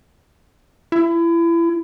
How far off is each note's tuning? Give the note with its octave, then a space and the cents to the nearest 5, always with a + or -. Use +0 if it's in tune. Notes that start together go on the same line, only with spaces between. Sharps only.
E4 +30